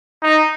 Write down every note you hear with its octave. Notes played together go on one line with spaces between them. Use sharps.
D#4